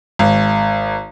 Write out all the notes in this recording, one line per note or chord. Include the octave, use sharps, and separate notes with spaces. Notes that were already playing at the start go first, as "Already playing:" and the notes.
G#1